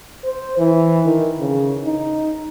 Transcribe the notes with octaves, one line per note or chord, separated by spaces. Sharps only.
C5
E3
D#3
C#3
D#4